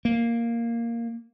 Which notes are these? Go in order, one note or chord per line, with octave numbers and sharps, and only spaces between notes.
A#3